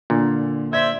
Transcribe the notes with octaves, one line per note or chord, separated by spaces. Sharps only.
A#2 D3
C5 D5 E5 G#6